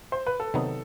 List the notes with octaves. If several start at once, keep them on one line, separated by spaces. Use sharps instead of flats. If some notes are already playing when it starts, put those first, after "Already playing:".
C5
B4
A4
C3 D#3 F#3 B3 D#4